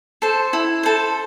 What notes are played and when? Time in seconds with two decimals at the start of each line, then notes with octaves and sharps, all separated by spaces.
0.22 A4 C5
0.53 E4
0.83 A4 C5